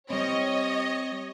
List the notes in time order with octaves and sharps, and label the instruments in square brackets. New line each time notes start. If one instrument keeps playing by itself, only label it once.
[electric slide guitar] G3 C4 [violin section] C#5 D#5